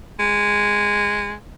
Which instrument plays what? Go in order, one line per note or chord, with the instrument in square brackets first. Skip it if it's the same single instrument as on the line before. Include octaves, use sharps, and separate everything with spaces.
[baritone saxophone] G#3